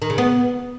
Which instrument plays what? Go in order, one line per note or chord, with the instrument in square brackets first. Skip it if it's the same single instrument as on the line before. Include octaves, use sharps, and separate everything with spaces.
[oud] D#3
C#3
B3